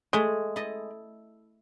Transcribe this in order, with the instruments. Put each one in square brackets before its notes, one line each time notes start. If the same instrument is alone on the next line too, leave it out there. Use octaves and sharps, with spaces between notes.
[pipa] G#3 [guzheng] A3
[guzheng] E4 A4 D#5